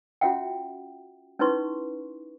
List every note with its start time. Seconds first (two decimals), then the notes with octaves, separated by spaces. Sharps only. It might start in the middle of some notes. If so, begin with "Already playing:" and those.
0.21 C#4 F4 F#4 E5 F#5 G5
1.39 C#4 D#4 E4 B4 C6 C#6